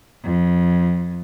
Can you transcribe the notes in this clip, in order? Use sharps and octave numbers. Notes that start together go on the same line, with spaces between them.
F2